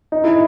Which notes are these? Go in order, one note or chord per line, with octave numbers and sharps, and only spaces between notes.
D#4
E4